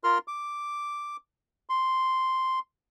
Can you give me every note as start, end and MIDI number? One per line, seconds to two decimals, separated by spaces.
0.04 0.18 65
0.04 0.18 70
0.04 0.18 84
0.04 0.18 89
0.28 1.17 86
1.70 2.59 84